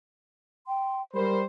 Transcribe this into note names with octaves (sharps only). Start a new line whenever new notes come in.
G5 C6
G3 A#4 C5 B5